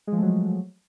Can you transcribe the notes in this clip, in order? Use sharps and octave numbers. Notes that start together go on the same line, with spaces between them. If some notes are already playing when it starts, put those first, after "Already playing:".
F3 F#3 G#3 A3